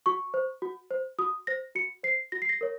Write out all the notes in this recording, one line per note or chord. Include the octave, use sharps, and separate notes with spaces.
F#4 C#6
C5
F#4
C5
F#4 D#6
C5 A#6
F#4 C#7
C5 C7
F#4 A#6
C7
A#6
A#4 C#5